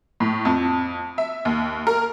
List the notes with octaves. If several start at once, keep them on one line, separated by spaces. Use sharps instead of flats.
A2
F2
E5
D#2
A#4